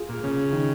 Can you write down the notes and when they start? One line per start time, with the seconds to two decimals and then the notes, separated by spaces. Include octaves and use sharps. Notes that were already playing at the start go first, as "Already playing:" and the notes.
Already playing: F4 G#4
0.09 A#2
0.23 C#3 C#4
0.53 D#3